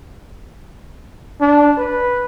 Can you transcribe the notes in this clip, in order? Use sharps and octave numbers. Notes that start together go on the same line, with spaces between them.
D4
B4